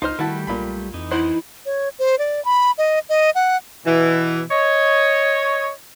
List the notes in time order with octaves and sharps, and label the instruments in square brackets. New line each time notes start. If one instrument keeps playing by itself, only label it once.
[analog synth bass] C#2 [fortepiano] D#4 C5 [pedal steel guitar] F4 C6 F6
[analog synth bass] D#3 [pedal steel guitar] G3 A3 G4 [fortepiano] E4 F#4 A5
[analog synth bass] B1 [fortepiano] A#2 B5
[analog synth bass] F2 [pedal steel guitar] E3 D#4
[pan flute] E4 [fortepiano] C5 F#5
[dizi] C#5
C5
D5
B5
D#5
D#5
F#5
[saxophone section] B2 E3
C#5 D#5